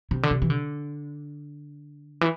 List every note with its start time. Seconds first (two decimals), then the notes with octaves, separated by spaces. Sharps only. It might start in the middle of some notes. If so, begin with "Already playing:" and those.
0.11 C3
0.23 D3
0.31 C3
0.42 E3
0.50 D3
2.21 E3